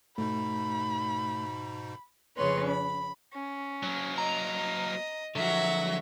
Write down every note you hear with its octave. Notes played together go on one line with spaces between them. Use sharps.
G#2 B2 A3 D#4 B5
F2 C#3 C#4 B4 C#5 C6
B5
C#4
F#3 A#3
D#5 A#5
D3 F3 F#3 F#4 E5